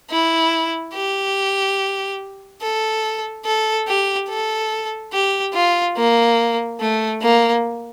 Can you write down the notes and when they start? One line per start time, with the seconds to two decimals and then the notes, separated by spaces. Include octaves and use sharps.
0.11 E4
0.94 G4
2.62 A4
3.45 A4
3.88 G4
4.29 A4
5.13 G4
5.54 F4
5.97 A#3
6.80 A3
7.22 A#3